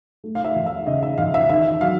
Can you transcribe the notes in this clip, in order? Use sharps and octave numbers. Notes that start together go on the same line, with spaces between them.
A3
F5
E5
E2
E5
C#3 D#5
E5
E2 F5
E5
D#3 E5
F#3 F5